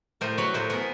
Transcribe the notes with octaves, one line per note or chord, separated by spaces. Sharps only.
A2 A#4 C5
F#3 B4 C#5
A2 A#4 C5
B3 G#4 A#4